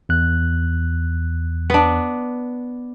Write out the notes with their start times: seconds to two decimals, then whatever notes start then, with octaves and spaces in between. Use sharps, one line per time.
0.09 E2 F#6
1.70 B3 D4